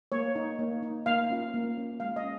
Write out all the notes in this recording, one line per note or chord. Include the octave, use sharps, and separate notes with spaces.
A#3 C#5
D#4
A#3
D#4
A#3 F5
C#4 F4
A#3
C#4 F4
G#3 F5
D#5
C#4